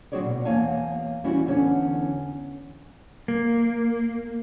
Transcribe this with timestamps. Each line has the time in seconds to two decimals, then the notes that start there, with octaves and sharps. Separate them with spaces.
0.12 F#3 C4 F#4 G#4 C#5 D5
0.23 B2
0.45 E2 A#3 C#5 F5 G#5 A5
1.24 E3 G3 C#4 E4 F#4
1.47 E2 D3 C#4 C#5
3.28 A#3